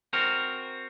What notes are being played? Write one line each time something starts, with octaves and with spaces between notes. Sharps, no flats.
C4 F#4 A#4